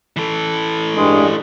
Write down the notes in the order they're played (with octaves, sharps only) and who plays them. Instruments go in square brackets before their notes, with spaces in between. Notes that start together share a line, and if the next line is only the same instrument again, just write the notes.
[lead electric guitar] E3 A4
[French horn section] G2 [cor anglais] G#3